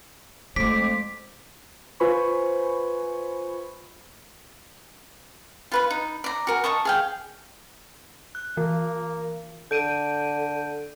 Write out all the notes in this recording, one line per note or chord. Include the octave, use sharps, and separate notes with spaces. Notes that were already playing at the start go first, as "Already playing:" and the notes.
F2 G#3 A3 C5 D6 B6
F4 B4 C5 G#5 B5 C#6
F4 B4 B5
D#4
D5 A#5
F#4 A#4 G#5
D#5 A5 C#6 D#6
G#4 F5 G5
F#6
E3 A#3
D3 G6 D7 D#7